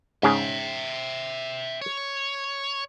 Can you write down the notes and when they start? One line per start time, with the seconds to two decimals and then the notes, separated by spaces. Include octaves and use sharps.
0.23 G#2 C#3 G#4 E5 G5
1.82 C#5